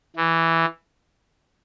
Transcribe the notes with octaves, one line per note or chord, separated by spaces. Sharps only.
E3